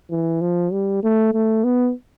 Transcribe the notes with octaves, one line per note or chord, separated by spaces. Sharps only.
E3
F3
G3
A3
A3
B3